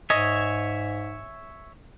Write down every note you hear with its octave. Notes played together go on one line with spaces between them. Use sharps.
G#2 C#5 D#5 E5 G#5